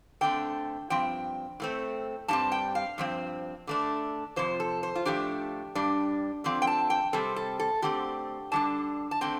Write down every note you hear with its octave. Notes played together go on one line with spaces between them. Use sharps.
D3 A3 C4 G5
G2 F3 C4 G5
A2 A3 C4
G2 G3 C4 A5
G5
F5
G2 F3 C4
D3 A3 D4
F2 C3 F3 C5
A4
C5
F4
A2 F3 A3 D4 G4
G2 G3 D4
D3 F3 C4
G5
A5
G5
C3 G3 C4 A4
A4
A4
D3 A3 C4 G4
D3 G3 D4 A5
A5
D3 A3 C4 G5